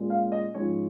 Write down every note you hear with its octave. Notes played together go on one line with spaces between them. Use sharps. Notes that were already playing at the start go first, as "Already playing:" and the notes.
Already playing: A#2 G#3 C#4
F5
D#5
G#2 F3 G#3 C#4 C#5